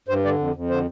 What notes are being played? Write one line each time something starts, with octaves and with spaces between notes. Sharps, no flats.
G2 C5
D3 D5
F2
F2
D3 C5